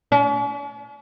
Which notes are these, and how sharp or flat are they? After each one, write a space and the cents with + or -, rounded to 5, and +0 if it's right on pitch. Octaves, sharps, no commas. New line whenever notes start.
C#4 +45